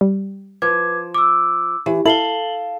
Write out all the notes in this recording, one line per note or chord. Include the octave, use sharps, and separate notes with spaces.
G3
F3 B4 D6 G#6
D6 E6
E3 G4
E4 A4 F5 F#7 G7